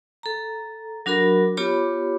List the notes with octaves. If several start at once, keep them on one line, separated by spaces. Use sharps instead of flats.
A4 A#5
F#3 D4 F#4 A#4 B5
B3 F4 G4 C#5 B5 D6